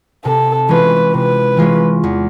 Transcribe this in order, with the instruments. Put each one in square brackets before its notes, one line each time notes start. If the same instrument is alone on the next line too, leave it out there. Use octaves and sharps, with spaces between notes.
[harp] C3 [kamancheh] A4
[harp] E3 G#3 C#4 F4 [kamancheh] B4
[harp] C3 [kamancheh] B4
[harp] E3 G#3 C#4 F4
E2